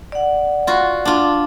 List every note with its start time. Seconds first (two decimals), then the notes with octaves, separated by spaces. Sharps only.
0.12 D5 F#5
0.67 F4 F#4
1.05 D4 F4